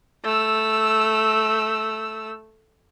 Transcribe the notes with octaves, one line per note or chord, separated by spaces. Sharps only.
A3 E6